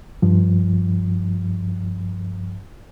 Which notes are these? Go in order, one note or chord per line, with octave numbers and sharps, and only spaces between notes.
G2 F3